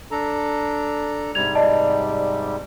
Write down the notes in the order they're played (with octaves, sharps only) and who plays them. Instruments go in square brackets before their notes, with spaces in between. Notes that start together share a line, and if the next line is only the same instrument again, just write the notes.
[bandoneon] D4 A4 A#5
[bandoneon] G#2 C3 G3 [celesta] G#6 F7
[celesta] D5 D#5 A5